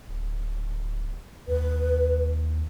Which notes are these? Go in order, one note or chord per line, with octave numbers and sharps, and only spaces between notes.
D1
D#2 B4